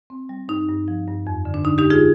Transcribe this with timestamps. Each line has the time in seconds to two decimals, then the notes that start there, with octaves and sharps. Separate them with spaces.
0.10 C4
0.29 G3
0.48 G2 D#4
0.69 G2
0.88 F3
1.08 G2
1.27 F2
1.45 D3
1.54 D4
1.65 D3 D#4
1.78 D#4 G4
1.84 G#3
1.90 F4 G#4